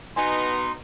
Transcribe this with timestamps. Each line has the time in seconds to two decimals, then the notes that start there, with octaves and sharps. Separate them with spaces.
0.16 B2 B3 D#4 G#5 C6